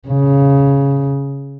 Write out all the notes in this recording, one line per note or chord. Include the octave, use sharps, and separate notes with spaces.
C#3